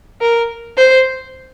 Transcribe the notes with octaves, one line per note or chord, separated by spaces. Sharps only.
A#4
C5